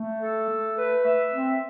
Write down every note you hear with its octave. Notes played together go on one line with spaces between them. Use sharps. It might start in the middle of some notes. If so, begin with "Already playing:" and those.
Already playing: A3
A4
A3
B4
E5
C4